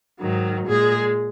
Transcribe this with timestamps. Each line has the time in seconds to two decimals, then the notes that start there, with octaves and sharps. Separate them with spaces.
0.18 G#2 D#3 F#3
0.66 A#2 G#3 G#4